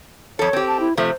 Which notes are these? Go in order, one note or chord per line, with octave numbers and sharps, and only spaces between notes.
F2 A4 C#5
C4 G4
A5
E4
C3 F3 A3 C5